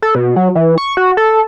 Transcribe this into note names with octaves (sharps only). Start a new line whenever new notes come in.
A4
B2
F#3
E3
C#6
F#4
A4